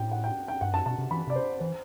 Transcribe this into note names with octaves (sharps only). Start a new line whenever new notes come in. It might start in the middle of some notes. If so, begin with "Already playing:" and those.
Already playing: A2 G5
F#5
G5
G5
G2 F#5
F#2 A5
B2 A5
C3
E3 B5
C3 D5
C5
E3 C5